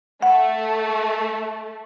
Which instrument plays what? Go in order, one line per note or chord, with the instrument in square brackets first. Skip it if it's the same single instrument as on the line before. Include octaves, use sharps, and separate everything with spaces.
[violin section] A3 [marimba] F#5